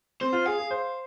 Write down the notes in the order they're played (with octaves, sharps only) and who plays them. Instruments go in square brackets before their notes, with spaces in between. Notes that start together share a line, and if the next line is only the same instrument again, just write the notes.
[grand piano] C4 [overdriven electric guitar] C5
[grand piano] F4
[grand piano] G#4 [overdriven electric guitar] F5
[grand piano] G#4
C5